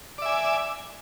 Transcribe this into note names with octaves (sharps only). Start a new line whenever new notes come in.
D5 E5 G#5